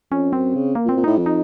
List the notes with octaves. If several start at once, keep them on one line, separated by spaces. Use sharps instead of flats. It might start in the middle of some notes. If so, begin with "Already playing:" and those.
F2 C#4
F#2 C4
C#3
A#3
A#2
C4
A#2
A2 D#4
F2
D#4